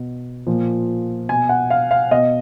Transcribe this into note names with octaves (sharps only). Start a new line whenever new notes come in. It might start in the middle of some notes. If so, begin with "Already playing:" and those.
Already playing: B2
A#2 F3
B2 G#5
F#5
F5
F5
B2 D#5